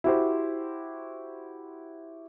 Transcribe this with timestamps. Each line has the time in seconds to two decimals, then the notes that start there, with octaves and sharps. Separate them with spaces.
0.04 E4 F#4 G4 C5